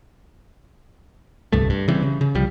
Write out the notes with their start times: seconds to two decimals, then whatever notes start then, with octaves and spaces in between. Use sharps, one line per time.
1.52 D1 C2 G2 A3
1.70 G2
1.88 C#3 E3 G3 C4
2.02 C#3
2.21 C#3
2.35 C2 F3 G3